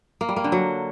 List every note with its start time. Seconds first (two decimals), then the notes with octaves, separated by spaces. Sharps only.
0.21 A#3
0.29 G3
0.36 A#3
0.44 D3
0.52 F#3